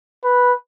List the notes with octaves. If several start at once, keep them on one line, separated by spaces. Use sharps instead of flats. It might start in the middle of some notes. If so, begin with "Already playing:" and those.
B4